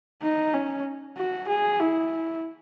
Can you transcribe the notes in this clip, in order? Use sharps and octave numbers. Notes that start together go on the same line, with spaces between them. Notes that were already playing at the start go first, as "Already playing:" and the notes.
D#4
C#4
F#4
G#4
E4